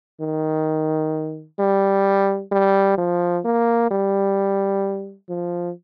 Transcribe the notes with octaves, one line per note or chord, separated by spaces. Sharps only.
D#3
G3
G3
F3
A#3
G3
F3